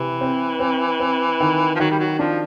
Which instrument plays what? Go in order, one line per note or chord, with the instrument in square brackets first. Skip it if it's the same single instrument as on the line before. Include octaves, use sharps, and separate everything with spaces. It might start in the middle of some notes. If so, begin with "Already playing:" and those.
Already playing: [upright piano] C3 [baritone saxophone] E3
[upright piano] C4
C4
C4
D#3
[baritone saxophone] F3
[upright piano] D#3 [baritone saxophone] F#3
[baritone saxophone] G3
F#3
[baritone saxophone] F3 [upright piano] D4